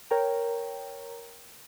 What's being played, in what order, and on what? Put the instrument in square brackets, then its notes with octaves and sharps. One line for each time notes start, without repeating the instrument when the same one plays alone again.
[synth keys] A#4 C#5 G5 A#5